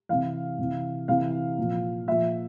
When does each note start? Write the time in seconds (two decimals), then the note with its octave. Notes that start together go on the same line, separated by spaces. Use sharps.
0.09 C3 E3 F5
0.59 C3 E3
1.08 C3 E3 F5
1.58 A#2 F3
2.07 A#2 F3 E5